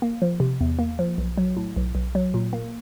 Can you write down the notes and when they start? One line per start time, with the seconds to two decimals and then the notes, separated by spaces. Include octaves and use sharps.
0.02 A#3
0.22 F3
0.40 C3
0.60 E2
0.79 A#3
0.99 F3
1.18 B1
1.38 F#3
1.56 A2
1.76 B1
1.95 B1
2.15 F#3
2.34 A#2
2.53 A#3